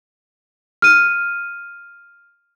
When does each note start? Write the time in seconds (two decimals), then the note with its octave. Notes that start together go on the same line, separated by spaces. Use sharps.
0.82 F6 D#7